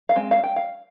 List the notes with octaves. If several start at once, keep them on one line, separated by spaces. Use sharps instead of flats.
F5
G#3 C4
F5
G5
F5